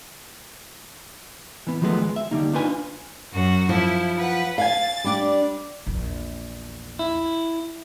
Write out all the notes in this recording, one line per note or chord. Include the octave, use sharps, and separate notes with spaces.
E3 B3
D#3 F3 F#3 G#3 A3 B3
G#3
E5
D3 G3 A#3 D#4
D4 D#4 F4 B4 G#5
F#2 F#4
F3 E4
B4 F#5
F5 G#5 A6
G3 D4
A#1 E2
E4